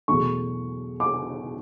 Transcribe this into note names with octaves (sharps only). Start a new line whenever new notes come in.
E2 B2 F#3 A3 C#6
D6